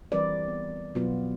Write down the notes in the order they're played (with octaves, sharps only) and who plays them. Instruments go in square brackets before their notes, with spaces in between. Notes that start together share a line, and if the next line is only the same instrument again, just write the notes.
[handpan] E3 G3 C4 A#4 B4 D5
B3
B2 F#3 B3 F4